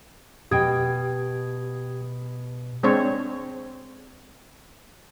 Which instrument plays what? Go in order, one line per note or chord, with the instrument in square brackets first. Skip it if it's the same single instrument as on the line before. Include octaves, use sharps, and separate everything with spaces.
[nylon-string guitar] B2 G5 [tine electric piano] G4 D#6 G#6
[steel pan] G#3 C4 D4 C5 C#5